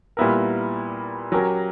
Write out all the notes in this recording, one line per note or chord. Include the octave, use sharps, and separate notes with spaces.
A#2 G3 B3 E4 A#4
F#3 C#4 G4 A#4